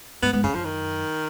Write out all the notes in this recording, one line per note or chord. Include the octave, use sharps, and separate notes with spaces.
G#2 B3
G#2 B3
F2 C#3
F#2 F3
D#3